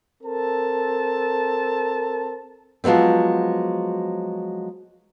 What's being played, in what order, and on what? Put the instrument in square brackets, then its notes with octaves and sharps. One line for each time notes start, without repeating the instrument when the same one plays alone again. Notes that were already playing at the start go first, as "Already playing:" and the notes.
[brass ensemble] C4 A4 A#4 A5
[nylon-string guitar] F3 F#3 G#3 B3 C4